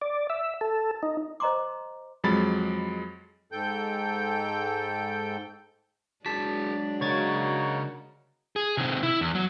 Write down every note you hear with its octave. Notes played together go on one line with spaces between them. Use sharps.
D5
E5
A4
D#4
C5 D#5 A#5 C6 D6
F2 F#3 G#3 B5 A6
G#2 A4 G5 G6
F#3 G#3 D4 F#4 G#4 A5 B6
C#3 A#3 D#4 F#4 G#4 C#5 G#6 A6
G#4
C3 D#3
E4
E2
F#3